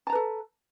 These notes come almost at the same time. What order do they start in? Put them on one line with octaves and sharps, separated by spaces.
A5 A#5 B4 A4